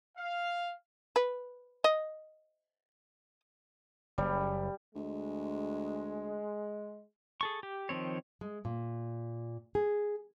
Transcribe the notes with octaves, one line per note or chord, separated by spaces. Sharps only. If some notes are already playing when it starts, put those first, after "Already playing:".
F5
B4
D#5
F#1 G3
D2 G#3
G#4 A4 C#6
G4
D#3 F3 C4 C#5
G#3
A#2
G#4